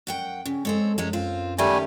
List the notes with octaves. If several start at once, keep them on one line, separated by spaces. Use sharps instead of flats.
F#2 F#5 G5
C#3 C#4
G#3 C4 A4 C#5
F#2 F#3 G#3 C#4
C4 F4
D#3 G3 A3 C#4 G4 G#5